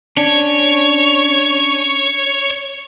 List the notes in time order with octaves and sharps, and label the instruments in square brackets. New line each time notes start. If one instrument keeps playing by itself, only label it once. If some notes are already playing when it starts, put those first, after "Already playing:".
[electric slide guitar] C#4 D4 [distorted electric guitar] C#5